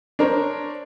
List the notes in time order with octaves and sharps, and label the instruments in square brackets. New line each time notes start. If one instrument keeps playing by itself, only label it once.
[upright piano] D4 A#4 C5 C#5